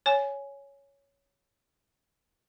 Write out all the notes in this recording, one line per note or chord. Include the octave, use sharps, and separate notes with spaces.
C#5 G#5